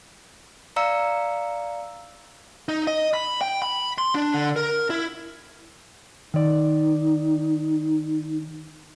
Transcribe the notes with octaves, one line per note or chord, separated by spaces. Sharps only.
D5 F5 A#5 E6 C#7
D#4
D#5
B5
G5
B5
C6
D4
D3
A#4
E4
D#3 D#4 D5